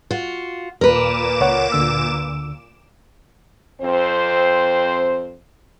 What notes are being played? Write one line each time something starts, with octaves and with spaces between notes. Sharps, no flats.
F4 F#4
D#2 A#2 A#4 B4 D6 E7
C#2 C#5 F#5
D2 D3 E6
F2 C4 C5